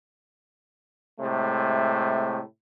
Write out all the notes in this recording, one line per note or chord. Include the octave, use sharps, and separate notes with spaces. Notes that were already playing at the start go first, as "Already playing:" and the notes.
A2 C3 G#3 A3